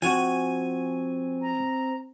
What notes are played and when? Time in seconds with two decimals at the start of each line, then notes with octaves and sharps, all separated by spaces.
0.02 F3 C4 F#4 G#5
1.42 A#5